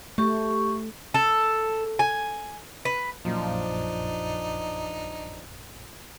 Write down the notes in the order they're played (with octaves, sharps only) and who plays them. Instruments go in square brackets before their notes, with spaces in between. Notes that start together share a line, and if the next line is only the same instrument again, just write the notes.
[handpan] A3 [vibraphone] G4 C#6
[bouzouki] A4
G#5
B4
[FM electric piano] A#1 F#2 A#2 [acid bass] F3 [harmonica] D4 D#4